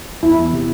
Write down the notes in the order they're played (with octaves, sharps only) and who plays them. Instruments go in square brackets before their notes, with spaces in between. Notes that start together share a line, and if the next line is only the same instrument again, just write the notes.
[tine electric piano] E2 [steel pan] E4
[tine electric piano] E2
C3